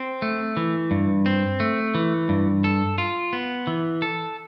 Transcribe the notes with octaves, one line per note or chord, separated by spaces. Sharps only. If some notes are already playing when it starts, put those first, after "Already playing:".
Already playing: C4
A3
E3
G2
C4
A3
E3
G2
A4
F4
B3
E3
A4